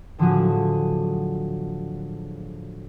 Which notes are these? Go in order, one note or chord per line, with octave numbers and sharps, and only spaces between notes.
A2 D3 F3 F#3 F#4 G#4